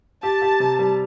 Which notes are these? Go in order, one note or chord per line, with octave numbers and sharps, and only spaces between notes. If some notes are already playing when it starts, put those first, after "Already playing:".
G4 A5
G4
C3
G3